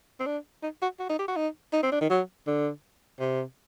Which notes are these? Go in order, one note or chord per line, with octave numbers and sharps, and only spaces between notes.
C4
D4
D#4
F#4
F#4
D#4
G4
F#4
D#4
D#4
C4
D4
D#3
F#3
D3
C3